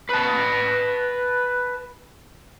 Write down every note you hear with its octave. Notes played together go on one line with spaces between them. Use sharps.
B4 A5